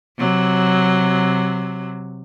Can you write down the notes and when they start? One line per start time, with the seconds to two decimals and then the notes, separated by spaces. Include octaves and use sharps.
0.18 C3 F#3